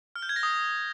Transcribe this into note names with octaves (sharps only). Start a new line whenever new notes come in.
F6
G6
G#6
A#6
D#6